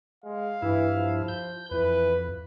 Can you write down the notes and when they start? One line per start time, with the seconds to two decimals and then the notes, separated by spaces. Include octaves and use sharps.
0.24 G#3 F5
0.62 G2 E3 E4
0.95 F3
1.28 G6
1.71 F2 E3 B4